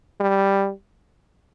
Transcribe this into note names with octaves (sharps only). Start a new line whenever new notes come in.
G3